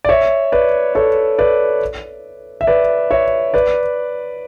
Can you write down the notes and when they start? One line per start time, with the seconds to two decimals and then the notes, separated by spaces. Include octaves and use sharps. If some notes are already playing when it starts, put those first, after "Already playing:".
0.05 D5
0.09 C#5 E5
0.52 B4 D5
0.95 A4 C#5
1.38 B4 D5
2.61 E5
2.67 B4 D5
3.11 C#5 E5
3.54 B4 D5